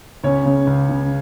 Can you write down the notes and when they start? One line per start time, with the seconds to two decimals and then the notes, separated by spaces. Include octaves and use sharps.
0.24 C#2 C#4 C#5
0.46 C#3
0.67 C#2
0.89 C#3